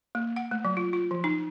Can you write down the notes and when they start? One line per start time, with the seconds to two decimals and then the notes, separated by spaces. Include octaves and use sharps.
0.15 A#3
0.36 F#5
0.51 A3
0.65 F#3
0.77 F4
0.93 F4
1.11 F3
1.24 D#4